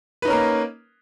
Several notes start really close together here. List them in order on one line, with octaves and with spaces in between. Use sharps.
B4 D#4 C#4 A#4 A#3